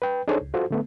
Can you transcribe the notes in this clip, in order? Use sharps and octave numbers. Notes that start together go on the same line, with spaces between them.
B4 G5
D4 D#4 G#4 A4 C5 C#5
C#2
F4 F#4 A4 C5
D3 A3 B3